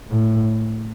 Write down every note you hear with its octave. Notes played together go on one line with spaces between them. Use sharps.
A2